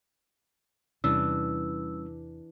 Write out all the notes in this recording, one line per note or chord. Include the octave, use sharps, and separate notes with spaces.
E2 C3 E3 G3 C#4 D4 E6